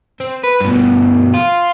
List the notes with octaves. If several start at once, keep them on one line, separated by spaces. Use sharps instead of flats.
C4
B4
G2 B2
F4